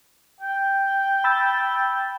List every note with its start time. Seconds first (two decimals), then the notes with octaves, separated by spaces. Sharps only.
0.40 G5
1.24 B5 E6 A6